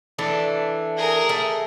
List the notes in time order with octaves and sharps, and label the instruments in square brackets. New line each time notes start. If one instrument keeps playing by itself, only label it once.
[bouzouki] E3 A3 D4
[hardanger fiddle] G#4 A#4
[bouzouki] A3